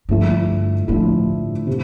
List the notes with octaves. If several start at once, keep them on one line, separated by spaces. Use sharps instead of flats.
G2 D3 F3 A3 E4
A2 D3 F3 A3 E4
C3